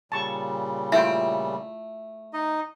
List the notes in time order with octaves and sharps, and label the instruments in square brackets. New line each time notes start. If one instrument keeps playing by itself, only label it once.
[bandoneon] A#2 C#3 G3 [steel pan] A5 C#6
[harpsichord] A3 [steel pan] E4 F4 G5 [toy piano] E5
[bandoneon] D#4 D#5